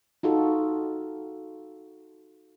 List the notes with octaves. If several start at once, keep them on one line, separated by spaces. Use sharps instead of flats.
D#4 F4 F#4 A4